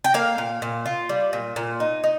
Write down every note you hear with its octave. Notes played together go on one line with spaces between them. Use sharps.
G5
A#3 F5
A#2
A#2
F4
G3
A#2
A#2
D#4
D#4